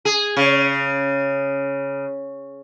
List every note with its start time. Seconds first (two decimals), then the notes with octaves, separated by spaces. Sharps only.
0.05 G#4
0.37 C#3